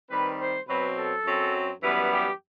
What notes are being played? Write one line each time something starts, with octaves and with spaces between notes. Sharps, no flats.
D#3 G3 C4 B4
C5
B2 F#3 C4 B4
A4
F#2 F#3 C4
F#2 E3 G3 B3 B4
G4